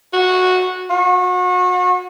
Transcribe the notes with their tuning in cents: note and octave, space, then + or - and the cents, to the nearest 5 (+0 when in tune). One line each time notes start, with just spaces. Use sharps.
F#4 -10
F#4 -35